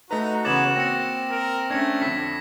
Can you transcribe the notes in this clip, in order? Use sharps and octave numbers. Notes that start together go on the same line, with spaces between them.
A3 D#4 F#4 B4 A#5
C#3 E3 B3 C#5 D6 A6 E7 F#7
A#3 C4 A#6 C#7
A#4 A#6
A3 C#4 D4 G#6 A#6 C#7
F2 D3 B6